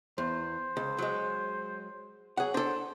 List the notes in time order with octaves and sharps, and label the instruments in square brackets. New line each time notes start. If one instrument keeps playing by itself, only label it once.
[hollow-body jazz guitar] E2 [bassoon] C5
[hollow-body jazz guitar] C#2
F#3 G#3
[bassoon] F#3 [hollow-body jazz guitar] G#4 F#5
[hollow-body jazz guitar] D4 A4 [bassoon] C5